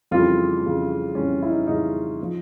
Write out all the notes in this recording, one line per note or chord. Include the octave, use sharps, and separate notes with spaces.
F2 C#3 E3 G3 F4
F2 C#3 E3 G3
F2 C#3 E3 G3 C#4
E4
D#4
F2 C#3 E3 G3 D#4
F3